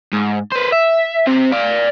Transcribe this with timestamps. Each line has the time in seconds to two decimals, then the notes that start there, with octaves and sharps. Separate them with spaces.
0.13 G#2
0.52 B4 C5
0.72 E5
1.27 C3 C4
1.52 D5 F5